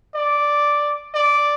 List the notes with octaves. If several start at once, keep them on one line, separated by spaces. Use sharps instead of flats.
D5
D5